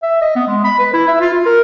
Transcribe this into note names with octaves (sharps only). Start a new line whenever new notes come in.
E5
D#5
B3
G#3
B5
B4
E4
E5
F4
F4
A#4